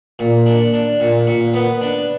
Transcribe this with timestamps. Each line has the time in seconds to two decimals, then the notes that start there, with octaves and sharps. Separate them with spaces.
0.19 A#2
0.46 D4
0.73 D4
1.00 A#2
1.27 A#2
1.54 B3
1.81 D4